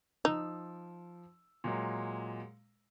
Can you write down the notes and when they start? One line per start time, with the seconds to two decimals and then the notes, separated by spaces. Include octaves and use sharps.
0.25 F3 D#4 E6
1.64 A#2 F#3 G#3